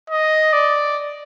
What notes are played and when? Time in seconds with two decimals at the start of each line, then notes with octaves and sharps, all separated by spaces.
0.10 D#5
0.53 D5